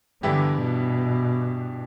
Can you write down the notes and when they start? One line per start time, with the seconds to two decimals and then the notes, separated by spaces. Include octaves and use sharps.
0.23 G2 D3 E3 B3 E4 G4
0.61 B2